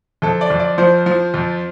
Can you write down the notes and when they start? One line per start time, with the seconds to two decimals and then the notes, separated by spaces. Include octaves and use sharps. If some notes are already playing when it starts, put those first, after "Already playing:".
0.22 F2 A4
0.41 D5
0.50 F2
0.60 D5
0.78 F3 C5
1.06 F3
1.34 F2